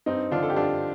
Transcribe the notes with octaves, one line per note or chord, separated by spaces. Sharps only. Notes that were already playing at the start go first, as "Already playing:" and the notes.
G2 C4 D#4
D3 F3 D4 F4
A4
G4
G2 D4 F4